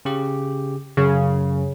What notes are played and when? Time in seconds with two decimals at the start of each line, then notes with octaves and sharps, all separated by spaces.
0.05 C#3 G4
0.97 F#2 C#3